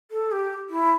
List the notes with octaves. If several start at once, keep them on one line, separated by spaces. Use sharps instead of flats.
A4
G4
E4